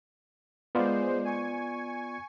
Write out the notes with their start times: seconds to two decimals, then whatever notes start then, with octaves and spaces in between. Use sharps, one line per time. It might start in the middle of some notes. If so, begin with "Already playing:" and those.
0.75 G#3 B3 F4 C5 D5
1.25 G#5 C#6